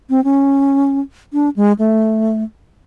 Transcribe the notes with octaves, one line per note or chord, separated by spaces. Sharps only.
C4
C#4
D4
G#3
A3